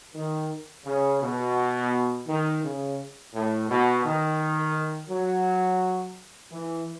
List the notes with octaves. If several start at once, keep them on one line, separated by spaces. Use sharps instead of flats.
D#3
C#3
B2
D#3
C#3
A2
B2
D#3
F#3
E3